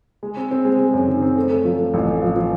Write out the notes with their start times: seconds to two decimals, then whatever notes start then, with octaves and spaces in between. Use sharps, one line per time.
0.23 G#3
0.37 C4
0.51 C4
0.65 G#3
0.79 G#3
0.93 F#2
1.08 D#3
1.22 C4
1.36 A3
1.51 A3
1.65 F3
1.78 A3
1.94 A1
2.08 A3
2.22 F3
2.36 F3